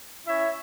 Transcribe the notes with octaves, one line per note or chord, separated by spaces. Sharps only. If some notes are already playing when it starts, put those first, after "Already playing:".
C#4 E4 C#5 E5